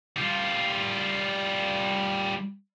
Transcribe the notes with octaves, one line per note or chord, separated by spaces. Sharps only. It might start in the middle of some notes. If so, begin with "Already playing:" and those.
G3 F4